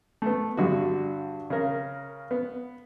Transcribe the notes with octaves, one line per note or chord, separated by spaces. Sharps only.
A3 B3
G2 D3 F#4
C#3 A#4
B3